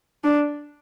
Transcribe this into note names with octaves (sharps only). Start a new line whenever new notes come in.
D4